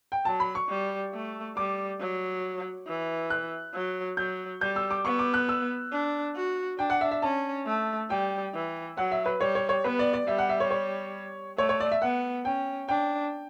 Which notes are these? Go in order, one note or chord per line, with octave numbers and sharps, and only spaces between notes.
G5
F#3 A5
B5
C#6
G3
A3
G3 D6
F#3
E3
F#6
F#3
F#3 G6
G3 G6
E6
D6
B3 C#6
D6
F#6
E6
D4
F#4
D4 G5
F#5
E5
E5
C#4 A5
A3
G3 G5
E3
F#3 F#5
E5
B4
G3 C#5
C#5
C#5
B3 B4
D5
D5
G3 E5
F#5
E5
C#5
C#5
A3 C#5
C#5
D5
E5
B3 F#5
C#4 G5
D4 G5